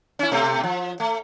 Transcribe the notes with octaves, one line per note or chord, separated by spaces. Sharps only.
C#4 E4
B2 A3 C4
F3
A3